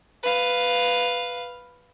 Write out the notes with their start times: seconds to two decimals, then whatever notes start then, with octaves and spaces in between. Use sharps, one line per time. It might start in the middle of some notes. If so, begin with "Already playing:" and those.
0.23 B4 F5